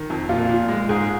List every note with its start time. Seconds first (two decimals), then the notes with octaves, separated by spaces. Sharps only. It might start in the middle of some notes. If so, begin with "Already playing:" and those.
Already playing: D#3
0.10 F2
0.29 A#2 F4
0.49 A#2
0.69 G#3
0.89 G#2 G#4